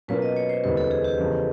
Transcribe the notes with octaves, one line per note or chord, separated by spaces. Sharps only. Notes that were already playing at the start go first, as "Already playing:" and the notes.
B2 F#3 A#3 C#4 F4 B4
D#5
C#5
C5
E1 D2 C3 E3 G3 B4
A4
G#4
G4
E2 C#3 F3